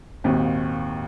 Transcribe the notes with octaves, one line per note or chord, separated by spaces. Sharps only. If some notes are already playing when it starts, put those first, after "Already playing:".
G#1 D#2 A#2